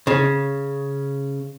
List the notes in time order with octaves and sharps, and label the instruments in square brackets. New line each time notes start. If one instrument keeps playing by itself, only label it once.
[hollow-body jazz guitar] C#3